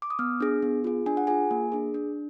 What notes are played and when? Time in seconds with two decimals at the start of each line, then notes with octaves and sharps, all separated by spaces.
0.02 D6
0.10 D#6
0.19 B3 F6
0.40 D4 G#4
0.62 B3
0.84 F4 G#4
1.06 D4 G#5
1.17 F#5
1.27 F4 G#4 G#5
1.51 A#3
1.72 D4 G#4
1.94 D4